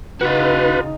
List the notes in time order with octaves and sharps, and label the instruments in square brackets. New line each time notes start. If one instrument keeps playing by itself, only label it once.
[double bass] C#3 D#4 [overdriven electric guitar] F#4 F5 [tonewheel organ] B4